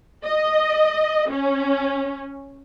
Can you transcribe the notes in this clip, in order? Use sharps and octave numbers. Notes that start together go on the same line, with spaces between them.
D#5
C#4